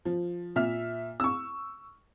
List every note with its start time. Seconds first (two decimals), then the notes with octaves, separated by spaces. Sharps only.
0.05 F3
0.56 A#2 E5 F6
1.20 C#6 E6